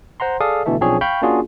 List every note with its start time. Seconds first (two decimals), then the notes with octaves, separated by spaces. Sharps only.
0.20 C5 F#5 A#5 C6
0.40 G#4 A4 D5 F5 D#6
0.66 B2 D3 E3 A3 A4 E5
0.81 B1 F3 C4 D4 G#4 C#5
1.01 F5 G5 B5 C#6 F6 G6
1.22 A#3 C#4 D4 F4 F#4 G#4